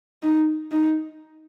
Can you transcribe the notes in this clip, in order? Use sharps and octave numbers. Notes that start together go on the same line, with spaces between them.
D#4
D#4